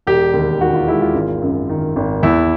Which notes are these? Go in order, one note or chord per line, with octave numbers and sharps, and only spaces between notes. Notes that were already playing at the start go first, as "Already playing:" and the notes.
E1 G4
D#2
D#3 F#4
F4
G#3 E4
F4
G#1
F#2
D#3
G#1
E2 E4